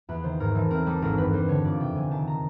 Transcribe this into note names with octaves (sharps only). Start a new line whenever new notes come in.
E2 B4
D#3 C5
G#2 A#4
E3 A4
C4 A#4
G3 A4
G#1 A#4
G2 B4
G3 C5
D3 C#5
F2 D5
C3 G5
F2 G#5
D#3 A5
A#5